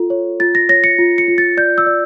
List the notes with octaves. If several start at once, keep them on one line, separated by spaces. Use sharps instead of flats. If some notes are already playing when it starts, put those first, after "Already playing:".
Already playing: F4 A4
C#5
F4 A6
A#6
C#5 A#6
C#7
F4
C#7
F4
A6
D5 G6
E6
D5